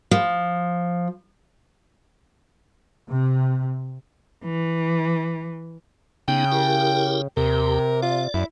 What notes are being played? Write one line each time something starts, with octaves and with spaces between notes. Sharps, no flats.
F3
C3
E3
C#3 B3 D#4 G5
E4 G4 A#4
D#2 C3 G4 A#4
F4 D5
F#2 E4